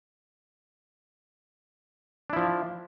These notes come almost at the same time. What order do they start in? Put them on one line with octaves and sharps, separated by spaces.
D4 E4 F3